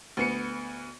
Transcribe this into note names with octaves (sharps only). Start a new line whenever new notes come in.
D2 B3 C#7